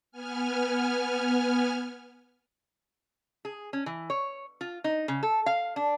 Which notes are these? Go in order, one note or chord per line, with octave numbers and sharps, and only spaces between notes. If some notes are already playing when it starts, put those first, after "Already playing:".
B3 G#5 F6
G#4
C#4
E3
C#5
F4
D#4
C#3
A4
F5
D4